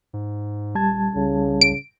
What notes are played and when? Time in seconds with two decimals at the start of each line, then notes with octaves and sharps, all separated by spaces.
0.13 G#2
0.75 D#1 G3 A5 G#6
1.15 C2 C#3
1.61 D7